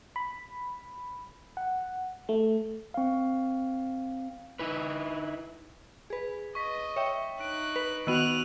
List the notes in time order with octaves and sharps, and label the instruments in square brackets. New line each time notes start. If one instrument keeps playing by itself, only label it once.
[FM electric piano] B5
F#5
A3
[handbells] C4 F5
[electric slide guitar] D#4 E4 B4
[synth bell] G#4 B4
[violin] D#5 [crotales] C#6 B6
[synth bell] C#5 E5 G5
[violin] D#4 F#6 [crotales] D7
[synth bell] B4
[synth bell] D#3 B3 F#4 [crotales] E6 D#7 F#7 [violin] F#6 F7